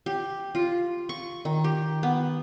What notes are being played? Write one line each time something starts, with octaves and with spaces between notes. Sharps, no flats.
G4
F4
C#6
D#3
G4
B3